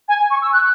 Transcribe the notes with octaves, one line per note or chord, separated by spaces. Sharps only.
G#5
C#6
E6
F#6